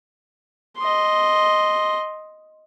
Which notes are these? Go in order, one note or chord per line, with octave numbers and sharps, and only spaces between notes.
D#5 C6